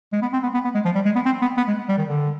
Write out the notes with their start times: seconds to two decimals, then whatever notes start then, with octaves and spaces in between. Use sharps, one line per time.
0.13 G#3
0.22 B3
0.33 C4
0.43 B3
0.54 B3
0.64 B3
0.74 G#3
0.85 F3
0.95 G3
1.05 G#3
1.15 B3
1.25 C4
1.42 B3
1.57 B3
1.68 G#3
1.89 G3
1.98 D#3
2.08 D3